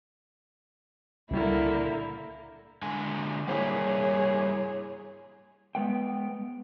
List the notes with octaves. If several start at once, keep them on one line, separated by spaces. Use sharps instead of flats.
C#2 A#2 D3 G3 A#3 E4
D3 G#3 G#5
G3 A#3 E4 G#4 C#5
G#3 B3 G5